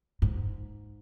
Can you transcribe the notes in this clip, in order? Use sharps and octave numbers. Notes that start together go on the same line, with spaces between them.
G#2